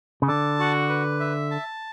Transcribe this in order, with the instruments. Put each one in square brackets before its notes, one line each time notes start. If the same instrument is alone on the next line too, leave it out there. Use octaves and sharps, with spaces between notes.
[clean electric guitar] C#3
[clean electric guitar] D3 [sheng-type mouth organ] A5
[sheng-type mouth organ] F#4
B4
E5
A5